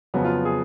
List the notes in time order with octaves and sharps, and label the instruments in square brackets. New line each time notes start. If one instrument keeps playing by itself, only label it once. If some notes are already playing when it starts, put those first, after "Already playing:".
[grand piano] F2 C#3 F#3 B3
F4
G#4